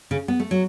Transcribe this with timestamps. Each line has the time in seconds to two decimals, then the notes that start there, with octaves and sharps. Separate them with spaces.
0.11 C#3
0.28 B3
0.40 A3
0.51 F#3